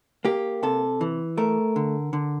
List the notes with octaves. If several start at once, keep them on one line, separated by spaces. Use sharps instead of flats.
A#3 G4
C3 A4
E3
A3 A#4
D3
D3